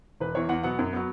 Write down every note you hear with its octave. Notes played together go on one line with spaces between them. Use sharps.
E1 B4
E2 E3 C#5
E2 F#5
B2 F#3 B3 F#5
F#2
F#3 B3